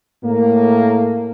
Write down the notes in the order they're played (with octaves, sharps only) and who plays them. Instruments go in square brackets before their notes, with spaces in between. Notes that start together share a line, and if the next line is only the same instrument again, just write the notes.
[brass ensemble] A2 A#3